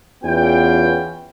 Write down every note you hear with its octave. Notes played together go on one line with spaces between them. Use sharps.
E2 B3 C#4 F4 G5